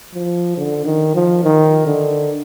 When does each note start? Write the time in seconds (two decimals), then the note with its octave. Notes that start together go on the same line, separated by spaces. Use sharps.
0.14 F3
0.57 D3
0.85 D#3
1.15 F3
1.43 D#3
1.86 D3